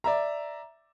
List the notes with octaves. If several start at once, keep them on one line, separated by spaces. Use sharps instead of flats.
D5 E5 A#5